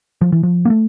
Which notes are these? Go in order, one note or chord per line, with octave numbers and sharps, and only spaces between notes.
F3
E3
F3
A#3
A3